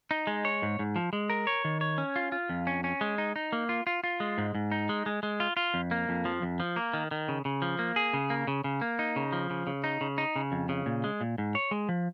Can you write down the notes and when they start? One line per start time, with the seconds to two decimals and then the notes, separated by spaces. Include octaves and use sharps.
0.11 D#4
0.27 G#3
0.45 C#5
0.62 G#2
0.79 G#2
0.96 F3
1.13 G#3
1.30 A#4
1.47 C#5
1.65 D#3
1.81 C#5
1.98 C#4
2.16 F4
2.32 F4
2.50 F2
2.67 C#4
2.84 C#4
3.01 G#3
3.18 D#4
3.36 D#4
3.53 A#3
3.69 F4
3.87 F4
4.04 F4
4.20 G#3
4.38 G#2
4.55 G#2
4.72 D#4
4.89 G#3
5.06 G#3
5.23 G#3
5.40 F4
5.57 F4
5.74 F2
5.91 A#3
6.09 F2
6.25 F3
6.42 F2
6.60 F3
6.76 A#3
6.94 D#3
7.11 D#3
7.28 C#3
7.45 C#3
7.62 F3
7.79 A#3
7.96 G#4
8.14 C#3
8.30 A#3
8.47 C#3
8.64 C#3
8.81 A#3
8.99 D#4
9.16 C#3
9.33 F3
9.50 C#3
9.67 C#3
9.84 D#4
10.01 C#3
10.18 D#4
10.36 C#3
10.52 F2
10.69 C#3
10.86 A#2
11.04 G#3
11.21 A#2
11.38 G#2
11.55 C#5
11.71 G#3
11.89 F3